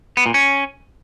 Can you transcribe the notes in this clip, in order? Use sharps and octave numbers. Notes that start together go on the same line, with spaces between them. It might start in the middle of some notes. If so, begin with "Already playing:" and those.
B3
A#2
C#4